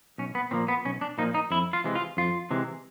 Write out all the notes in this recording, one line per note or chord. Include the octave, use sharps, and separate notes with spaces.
B1 C#4
B3
A#2 F3 A#3 C4
B3
B1 C#4
D4
A#2 F3 A#3 D#4
D#4
F2 E4
F4
C3 E3 G#3
F4
F2 F4
C3 E3 G#3